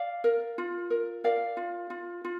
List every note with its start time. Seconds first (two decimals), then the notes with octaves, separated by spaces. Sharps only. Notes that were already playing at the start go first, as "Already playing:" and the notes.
Already playing: D5 F5
0.24 A#4
0.58 F4
0.90 A#4
1.24 A#4 D5 F5
1.57 F4
1.90 F4
2.24 F4